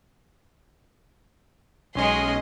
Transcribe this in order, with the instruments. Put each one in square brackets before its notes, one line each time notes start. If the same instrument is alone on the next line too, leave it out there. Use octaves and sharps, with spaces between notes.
[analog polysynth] B1 C#4 D#5 [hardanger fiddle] G#3 C6